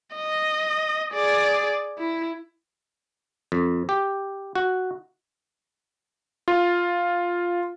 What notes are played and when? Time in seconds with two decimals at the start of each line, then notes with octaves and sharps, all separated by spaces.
0.15 D#5
1.14 G#4 D5
1.98 E4
3.52 F2
3.89 G4
4.55 F#4
6.48 F4